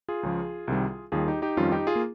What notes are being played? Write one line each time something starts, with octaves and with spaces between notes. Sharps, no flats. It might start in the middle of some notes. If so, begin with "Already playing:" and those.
F4 G#4
C#2 C#3 F3
C2 C3 D#3 G3
D#2 D#3 G3 F4 G#4
D#4 G4
D#4 G4
F2 D#3 G3 C#4 F4
D#4 G4
F4 G#4
A#3